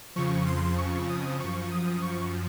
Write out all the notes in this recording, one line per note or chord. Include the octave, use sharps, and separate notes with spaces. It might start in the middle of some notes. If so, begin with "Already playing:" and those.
F2 C#3 F3 C#6
C6
C#6
D#6
F#2 F3 C#6
D#6
C#6